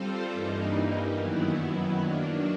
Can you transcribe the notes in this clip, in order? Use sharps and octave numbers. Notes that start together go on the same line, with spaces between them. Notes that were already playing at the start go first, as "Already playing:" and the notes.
Already playing: G3 C4 F4 A4 C5
G2 E3 G3 A#3 D#4
F#2 D#3 F#3 B3 E4
D#3 F#3 A#3 D4